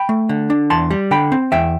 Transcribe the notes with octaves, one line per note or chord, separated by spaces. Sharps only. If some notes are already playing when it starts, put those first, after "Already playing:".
Already playing: G5 B5
A3
D3
D4
E2 A5 C6
G3
D3 G5 B5
C4
E2 E5 G5